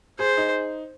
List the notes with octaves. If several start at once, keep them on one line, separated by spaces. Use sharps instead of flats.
G#4 C5
D#4